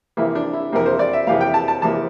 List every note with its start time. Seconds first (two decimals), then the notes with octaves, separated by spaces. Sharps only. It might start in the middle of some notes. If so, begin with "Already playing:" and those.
0.17 F2 C3 E3 A#3 E4
0.35 D4
0.53 E4
0.72 F2 C3 E3 A#3 A#4
0.86 C5
0.99 D5
1.13 E5
1.27 F2 C3 E3 A#3 F5
1.41 G5
1.54 A5
1.68 A5
1.81 F2 C3 E3 A#3 A5